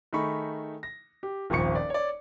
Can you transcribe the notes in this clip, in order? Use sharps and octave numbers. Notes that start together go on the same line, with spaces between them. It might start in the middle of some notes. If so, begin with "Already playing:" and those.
D#3 A3 D#4 G#4 B5 C#6
A#6
G4
D#1 G#1 F3 C#6 C#7
D5
C#5 D5